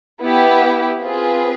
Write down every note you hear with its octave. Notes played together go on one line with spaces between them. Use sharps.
B3 E4 G4
C4 F4 G#4 B4